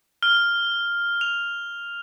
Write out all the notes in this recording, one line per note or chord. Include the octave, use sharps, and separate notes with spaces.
F6
F7